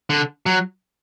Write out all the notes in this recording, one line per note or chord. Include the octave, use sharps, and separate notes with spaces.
D3
F#3